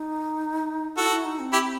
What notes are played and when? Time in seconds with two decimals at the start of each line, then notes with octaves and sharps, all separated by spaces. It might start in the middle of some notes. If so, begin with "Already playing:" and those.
Already playing: D#4
0.97 E4 F#4 A4
1.11 E4
1.25 D#4
1.39 C4
1.53 E4 G4